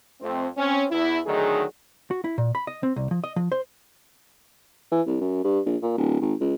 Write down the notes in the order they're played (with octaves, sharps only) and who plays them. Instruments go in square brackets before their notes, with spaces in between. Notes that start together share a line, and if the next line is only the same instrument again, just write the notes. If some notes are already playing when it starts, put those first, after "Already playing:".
[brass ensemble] F2 A3 C4
C4 C#4
E2 E4
D3 D#3 F#3 A3 D#4 G#4
[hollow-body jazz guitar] F#4
E4
A#2
B5
D#5
C4
C2
F3
D#5
F3
C5
[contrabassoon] E3
C2
F#2
G2
A#1
A#2
D1
G#1
C#2